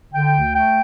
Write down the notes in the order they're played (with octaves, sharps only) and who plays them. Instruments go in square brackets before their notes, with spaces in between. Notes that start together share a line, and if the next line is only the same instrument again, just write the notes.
[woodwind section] D3 G5
D2
A3 G5